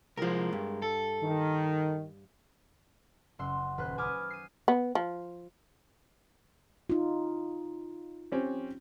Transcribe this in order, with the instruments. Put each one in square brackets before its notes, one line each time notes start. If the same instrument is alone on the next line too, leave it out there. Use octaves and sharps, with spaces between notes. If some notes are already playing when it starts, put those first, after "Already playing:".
[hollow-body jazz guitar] C2 F3 [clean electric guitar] G#3 A#4
[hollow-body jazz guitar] G2
[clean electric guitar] A4
[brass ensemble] D#3
[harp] F#1 F#5 C6 E6
D#1 B4 C5 B5 F#6
G#5 B5 D6 D#6 F6 F#6
C7 D#7
[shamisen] B3
F3
[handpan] D#4 F4
[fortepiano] C4 C#4 G4